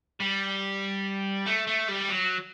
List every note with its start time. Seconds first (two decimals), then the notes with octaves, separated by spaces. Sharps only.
0.20 G3
1.46 A3
1.67 A3
1.89 G3
2.10 F#3